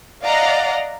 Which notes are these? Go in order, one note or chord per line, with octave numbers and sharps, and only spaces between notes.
D5 D#5 F5 F#5 A#5